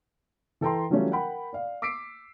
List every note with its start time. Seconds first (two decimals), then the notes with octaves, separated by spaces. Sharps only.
0.61 E3 A4 G5 A#5 C6
0.90 E3 F#3 G3 A3 C#4 F4
1.11 A#4 F#5 G5 B5
1.53 D5 F5
1.82 D6 E6 B6 C7 D7